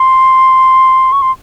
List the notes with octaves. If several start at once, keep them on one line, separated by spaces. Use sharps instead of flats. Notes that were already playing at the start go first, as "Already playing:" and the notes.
Already playing: C6
C#6
C6